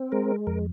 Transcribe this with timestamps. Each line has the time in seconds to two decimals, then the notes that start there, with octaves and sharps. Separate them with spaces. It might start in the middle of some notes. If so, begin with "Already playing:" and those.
Already playing: C4
0.12 G#3 A#4
0.47 F2 A#4